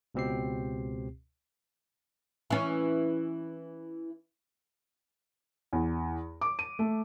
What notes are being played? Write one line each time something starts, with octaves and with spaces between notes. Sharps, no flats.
C#2 B2 C4 G4 C7
E3 C#4
E2
D6
D#7
A3